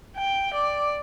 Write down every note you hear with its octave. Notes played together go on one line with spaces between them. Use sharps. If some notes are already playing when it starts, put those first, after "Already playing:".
G5
D5